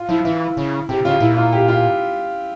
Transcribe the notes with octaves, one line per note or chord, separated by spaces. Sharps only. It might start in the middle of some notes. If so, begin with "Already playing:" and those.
Already playing: F4
F3 E4
E3 E4
C#3
C3 G4
C#3 F4
A#2 E4
F4
G4
F4